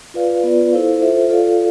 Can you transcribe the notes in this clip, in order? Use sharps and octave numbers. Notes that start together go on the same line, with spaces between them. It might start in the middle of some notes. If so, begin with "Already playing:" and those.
F4 B4 D5 F5
B3 F4 B4 D5
E4 A4 C5 F5
F4 A4 C5 E5
F4 A4 D5 F5